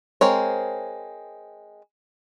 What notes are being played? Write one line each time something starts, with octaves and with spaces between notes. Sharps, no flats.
G#3 C4 A#4 C#5